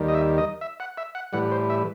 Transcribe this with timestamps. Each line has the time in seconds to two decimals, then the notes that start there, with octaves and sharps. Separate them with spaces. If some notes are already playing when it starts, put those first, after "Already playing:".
Already playing: D#2 D#3 G3
0.08 D#5
0.14 E5
0.38 D#5
0.61 E5
0.80 F#5
0.97 E5
1.15 F#5
1.33 A2 E3 G3 F#5
1.52 C5
1.70 E5